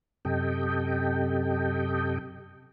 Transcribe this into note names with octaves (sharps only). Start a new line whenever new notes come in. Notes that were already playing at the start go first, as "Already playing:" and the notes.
F#2 C3 G4 A4 D#5 G5